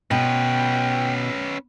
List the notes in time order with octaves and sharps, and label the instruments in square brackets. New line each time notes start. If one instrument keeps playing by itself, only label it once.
[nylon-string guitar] B2 [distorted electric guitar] C#4 B4 [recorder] G5